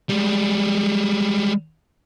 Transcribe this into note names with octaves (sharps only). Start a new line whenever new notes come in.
G3 G#3